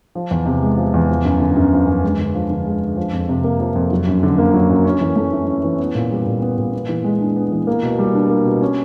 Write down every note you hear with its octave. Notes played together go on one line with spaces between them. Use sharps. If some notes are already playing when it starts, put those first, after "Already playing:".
F3
E2
C3
G#3
F3
E2
F3
F#2
D3
F#2
F3
F#2
G#3
D3
F3
D3
G#3
D3
F3
F2
C3
A#3
F3
F2
F#3
F#2
D3
A#3
F#3
F#2
C#4
E3
A3
E4
C#4
E3
B3
A#2
G3
A#2
B3
A#2
B3
E3
G#3
D4
B3
E3
A#3
B2
G3
D4
A#3
B2
C#4